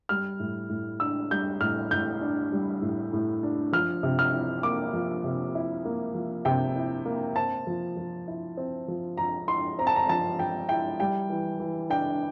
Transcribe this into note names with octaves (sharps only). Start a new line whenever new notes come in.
G3 F6
A2
A2
D4 E6
G3 G6
A2 F6
A2 G6
D4
G3
A2
A2
D4
F3 F6
C3
F6
E4
A#3 D6
F3
C3
E4
A#3
F3
C3 G5
E4
A#3
C4 A5
F3
F3
E4
C4
F3
F3 A#5
E4 C6
C4 A#5
A5
A#5
F3 A5
F3 G5
E4 G5
G3 G5
E3
E3
D4 G5